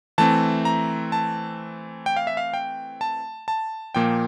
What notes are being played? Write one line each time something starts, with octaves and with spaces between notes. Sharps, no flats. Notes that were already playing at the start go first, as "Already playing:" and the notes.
E3 A3 C4 A5
A#5
A5
G5
F5
E5
F5
G5
A5
A5
A#2 F3 A#3 G5